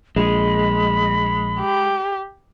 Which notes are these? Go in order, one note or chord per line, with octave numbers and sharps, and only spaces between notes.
A#1 G#3 B5
G4